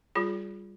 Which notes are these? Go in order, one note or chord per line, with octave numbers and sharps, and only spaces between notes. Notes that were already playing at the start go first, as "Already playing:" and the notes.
G3 F4 G#4